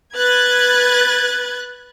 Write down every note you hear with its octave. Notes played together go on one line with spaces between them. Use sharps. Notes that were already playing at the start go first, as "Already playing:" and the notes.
B4 F#6 G#6 A6